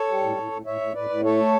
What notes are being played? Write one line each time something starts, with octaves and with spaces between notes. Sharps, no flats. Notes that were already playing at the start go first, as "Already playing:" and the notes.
Already playing: A4 C#5
G3
A2
A2
A2
A2 C#5 E5
A2
A2 B4 D5
A2
A3 A4 C#5